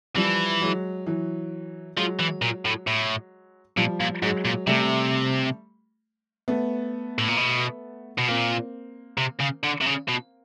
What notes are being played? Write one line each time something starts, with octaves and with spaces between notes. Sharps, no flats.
E3 F3 G3
F#3 G#3
E3 F#3
F3 F#3 G#3
E3
A#2
A2
A2
A#2 F3 G3
A#2
G#2 F#3 G#3
A#2
C3 G3 A3
A3 B3
A2
A#2
B2
B2
A#2 A#3 C4
C3
C#3
D3
C3
C#3
B2